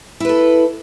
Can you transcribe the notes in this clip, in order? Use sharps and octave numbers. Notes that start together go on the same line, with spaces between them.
E4 A4 B4